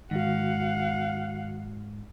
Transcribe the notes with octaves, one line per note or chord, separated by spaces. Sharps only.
G#2 D#3 F#4 F5 F#5